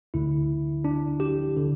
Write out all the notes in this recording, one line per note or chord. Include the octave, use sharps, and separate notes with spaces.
D2 D3 E4
D4
G4
D3